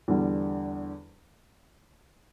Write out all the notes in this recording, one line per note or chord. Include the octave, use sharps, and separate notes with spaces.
E2 D3 G3